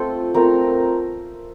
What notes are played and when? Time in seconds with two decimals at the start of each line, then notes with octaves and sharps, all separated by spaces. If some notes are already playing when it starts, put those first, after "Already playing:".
Already playing: A3 C4 F4 A4
0.34 A3 C4 F4 A#4